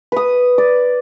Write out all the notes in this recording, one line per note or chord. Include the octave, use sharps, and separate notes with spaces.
B4 D#6
D5